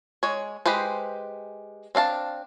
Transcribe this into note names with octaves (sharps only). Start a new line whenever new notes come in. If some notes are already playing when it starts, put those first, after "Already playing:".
G#3 C#5
G#3 G4 B4 C5
C4 D4 F5 A5